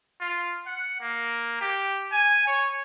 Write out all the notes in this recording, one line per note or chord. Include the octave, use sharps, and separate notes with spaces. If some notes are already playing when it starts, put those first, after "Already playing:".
F4
F#5
A#3
G4
G#5
C#5